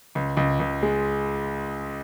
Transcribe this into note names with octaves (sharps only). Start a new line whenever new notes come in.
C#2
C#2
C#2
G#3